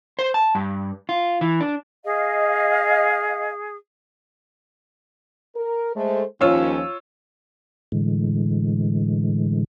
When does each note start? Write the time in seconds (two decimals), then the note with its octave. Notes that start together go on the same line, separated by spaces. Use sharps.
0.19 C5
0.34 A5
0.55 G2
1.09 F4
1.41 E3
1.61 D4
2.04 G#4 D#5 F5
5.56 A#4
5.96 G#3 A3 C5
6.41 D#2 F3 C#4 F4 C#5 E6
7.92 A2 D3 E3 G#3